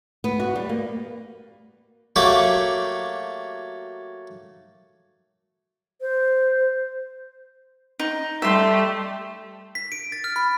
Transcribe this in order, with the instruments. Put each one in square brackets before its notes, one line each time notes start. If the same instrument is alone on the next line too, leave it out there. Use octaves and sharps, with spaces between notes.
[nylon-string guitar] B3
F#4
G3
A#3
[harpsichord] F#3 A3 A#3 G4 C#5
[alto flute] C5
[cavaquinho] D#4
[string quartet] G3 A3 G4 [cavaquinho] E5 C6
[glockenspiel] B6
D7
A6
F6
B5